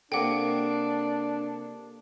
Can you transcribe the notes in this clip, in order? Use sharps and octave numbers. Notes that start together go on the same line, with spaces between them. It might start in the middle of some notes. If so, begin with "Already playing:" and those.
C3 A#3 D4 A4 F#5 G5 D6